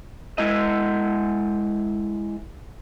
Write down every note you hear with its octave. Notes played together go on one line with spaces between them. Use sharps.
G#3 E4 D#5